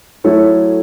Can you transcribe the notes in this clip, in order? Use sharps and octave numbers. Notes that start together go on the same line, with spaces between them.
F#3 A3 E4 A4 C#5